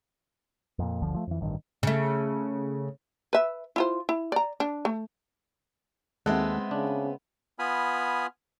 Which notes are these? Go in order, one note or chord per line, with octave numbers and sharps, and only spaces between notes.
F2 A#2
G1 D2 D3 F3
F3 A3
F2 E3
A1 G2 D#3
C#3 A3
B4 E5
E4 F4 C5
E4
D5 A#5
D4
A3
D#2 G#3 B3 C4 A4 E5 F#5
C#3 D4
B3 F4 G#5 B5 D#6 F6